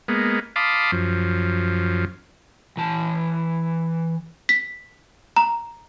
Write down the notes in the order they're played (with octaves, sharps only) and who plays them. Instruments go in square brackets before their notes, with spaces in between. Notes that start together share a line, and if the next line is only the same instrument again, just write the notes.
[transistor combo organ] G#3 A#3 B3
F5 A5 B5 C6 D6 D#6
F#2 F3
[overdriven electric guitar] E3 A5
[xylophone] B6
A#5